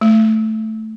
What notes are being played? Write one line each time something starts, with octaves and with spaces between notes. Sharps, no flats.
A3